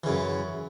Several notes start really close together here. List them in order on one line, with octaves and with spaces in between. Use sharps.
E3 C#3 F#2